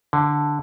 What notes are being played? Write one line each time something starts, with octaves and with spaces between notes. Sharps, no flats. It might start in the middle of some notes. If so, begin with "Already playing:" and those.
D3